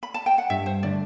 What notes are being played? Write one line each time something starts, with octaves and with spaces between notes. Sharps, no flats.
B5
A5
G5
F#5
G2 E5
C5
D3 A3 D5